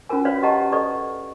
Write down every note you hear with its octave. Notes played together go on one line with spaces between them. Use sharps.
C#4 F4 F#4 A#4 G#5
F#4 B4 C#5 D5 F5
G4 D#5 F#5 A5 A#5 C#6
A4 B4 D5 D#5 C#6